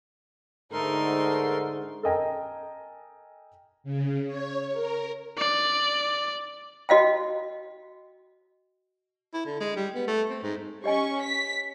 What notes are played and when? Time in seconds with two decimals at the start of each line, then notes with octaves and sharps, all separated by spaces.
0.72 G#2 D3 A3 D#4 A4 A#4 C6
2.03 A4 A#4 D#5 G5 G#5 A#5
3.84 C#3
4.26 C#5
4.73 A#4
5.38 D5
6.89 F#4 D#5 F5 G5
9.34 E4
9.46 D3
9.60 G#3
9.76 G3
9.95 B3
10.07 A3
10.29 C4
10.43 G#2
10.84 C#4 G4 D#5 G#5 C#6
11.20 B6